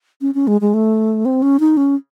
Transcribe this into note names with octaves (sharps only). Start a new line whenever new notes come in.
C#4
C#4
G#3
G#3
A3
C4
C#4
D#4
C#4